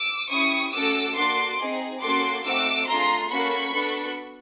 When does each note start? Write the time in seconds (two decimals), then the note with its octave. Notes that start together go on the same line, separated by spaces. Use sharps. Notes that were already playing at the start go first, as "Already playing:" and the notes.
Already playing: D6 E6
0.30 C#4 E4 G4 C#6 D#6
0.73 A3 C#4 F#4 A4 D6 E6
1.15 A#3 D4 F#4 A4 C6 D6
1.58 C4 D#4 G#4
2.01 A#3 C#4 F#4 A4 C6 D6
2.44 A3 C4 D#4 F#4 D6 E6
2.87 A3 D4 F4 G#4 A#5 C6
3.30 A#3 C#4 F#4 A4 B5 C#6
3.73 B3 D4 F#4 A4